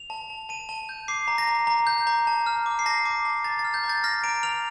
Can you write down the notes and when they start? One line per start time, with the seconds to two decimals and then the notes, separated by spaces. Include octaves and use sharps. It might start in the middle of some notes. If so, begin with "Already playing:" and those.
Already playing: F7
0.10 A5
0.30 A5
0.49 A5 D#7
0.69 A5
0.89 G6
1.08 D6 C7
1.28 A#5
1.38 A#6
1.48 A#5
1.67 A#5
1.87 G6
2.07 A#5
2.27 A5
2.46 F6
2.66 D6
2.79 C7
2.86 A5 A#6
3.05 D6
3.25 A5
3.44 A#5 A6
3.59 A6
3.64 F6
3.74 G6
3.83 A#5
3.89 A6
4.04 F6 A#6
4.24 A#5 D7
4.43 F6 F7